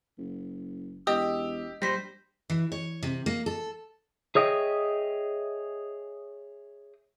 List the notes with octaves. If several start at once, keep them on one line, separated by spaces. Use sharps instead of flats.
F#1
E1 G4 D#5 D#6 E6
A#1 G3 C5 A#6 B6
E3
C#5
C3
A#3
A4
G#4 C#5 D#5 E5 F#5 G5